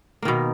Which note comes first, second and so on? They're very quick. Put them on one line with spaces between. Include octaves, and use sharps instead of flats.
A#3 D#3 B2